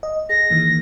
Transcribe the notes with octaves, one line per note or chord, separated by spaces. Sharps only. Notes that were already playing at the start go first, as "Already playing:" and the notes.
D#5
G#4 A#6
D#3 E3 A#3